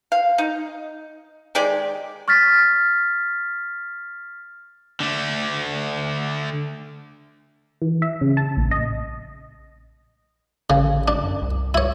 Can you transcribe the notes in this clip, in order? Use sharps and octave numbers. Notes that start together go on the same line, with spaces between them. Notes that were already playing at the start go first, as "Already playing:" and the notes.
F5
D#4
D#3 G#3 G4 D5
C#6 F6 A6 B6
D3 A3
E3
E5
C#3
A5
A#1
D#5
A1 C#3
D4
F#2
C2
C#2 E4 C#5